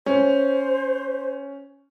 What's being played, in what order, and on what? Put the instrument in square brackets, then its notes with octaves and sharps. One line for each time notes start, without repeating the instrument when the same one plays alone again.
[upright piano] C#4 [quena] C5